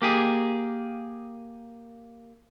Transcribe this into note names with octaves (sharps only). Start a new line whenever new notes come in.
A#3 G4 G#4